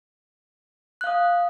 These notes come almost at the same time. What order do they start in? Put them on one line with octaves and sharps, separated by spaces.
F#6 F5 D#6